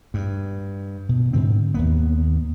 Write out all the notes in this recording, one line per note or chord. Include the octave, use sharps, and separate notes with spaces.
G2
B2
G#2 D3 C4
D#2 A#3 B3